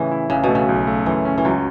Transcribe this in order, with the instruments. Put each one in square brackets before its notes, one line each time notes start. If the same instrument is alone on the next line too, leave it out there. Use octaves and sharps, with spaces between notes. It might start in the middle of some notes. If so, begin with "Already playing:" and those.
Already playing: [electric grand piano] A2 [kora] C#3 E3
[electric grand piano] E4
[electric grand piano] A1 [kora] C#3
[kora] B2
[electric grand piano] A3
[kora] C#3
[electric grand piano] B1
A3
[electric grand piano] F#2 [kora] E3
[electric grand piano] C#4
[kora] E3
[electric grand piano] C#2 [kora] F#3